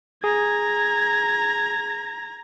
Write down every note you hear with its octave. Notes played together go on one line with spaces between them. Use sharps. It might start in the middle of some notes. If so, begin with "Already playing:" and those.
G#4 A#5 G#6